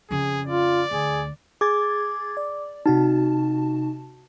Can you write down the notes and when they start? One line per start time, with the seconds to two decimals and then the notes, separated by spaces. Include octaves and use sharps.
0.11 F2 C#3 G#4
0.47 F4 D5
0.91 D2 G#4
1.61 G#4 D6 G#6 A6
2.37 D5
2.86 C3 D#4 F#4 A5